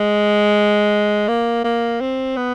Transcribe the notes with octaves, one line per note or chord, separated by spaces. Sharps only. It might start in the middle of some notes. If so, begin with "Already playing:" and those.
Already playing: G#3
A#3
A#3
C4
B3